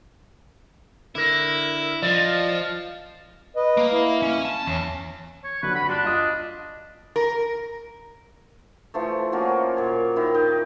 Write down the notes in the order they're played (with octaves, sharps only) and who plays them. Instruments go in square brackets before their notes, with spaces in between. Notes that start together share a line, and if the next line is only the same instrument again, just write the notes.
[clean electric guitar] D3 A#4 [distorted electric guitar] E4
[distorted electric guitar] F3 [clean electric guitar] D5 D#5 F5
[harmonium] B4 D#5
[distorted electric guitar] A#3
[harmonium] E4
[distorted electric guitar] C#4
A5
[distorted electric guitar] E2 [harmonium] C#4
[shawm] C#5
[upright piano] D3 F#3 [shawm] B4
[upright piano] F#4 [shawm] B5
[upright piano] G2 C6 F#6 [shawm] D4
[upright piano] F4 D#5 D#6
[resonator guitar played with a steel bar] A#4
[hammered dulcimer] E3 F3 A3
F3 F#3 A#3 C#4
A#2 C#5
D#3 E4
D#4 G5